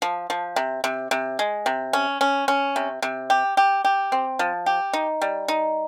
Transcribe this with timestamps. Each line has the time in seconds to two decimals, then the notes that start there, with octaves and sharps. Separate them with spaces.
0.02 F3
0.30 F3
0.56 C3
0.84 C3
1.11 C3
1.39 G#3
1.66 C3
1.93 C#4
2.21 C#4
2.48 C#4
2.76 C3
3.02 C3
3.30 G4
3.57 G4
3.85 G4
4.12 C4
4.39 F3
4.66 G4
4.93 D#4
5.21 G3
5.48 D#4